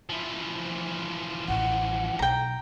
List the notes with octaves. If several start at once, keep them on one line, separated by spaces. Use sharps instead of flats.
E3 F3
A1 F#5
B1 G5 A#5